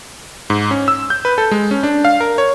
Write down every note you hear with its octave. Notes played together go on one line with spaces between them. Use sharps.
G#2
C#4
E6
G6
B4
A4
G#3
C#4
D4
F5
A#4
C#5